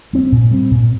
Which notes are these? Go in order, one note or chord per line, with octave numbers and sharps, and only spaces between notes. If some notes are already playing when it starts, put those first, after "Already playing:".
G3 C4
A#2
G3 C4
A#2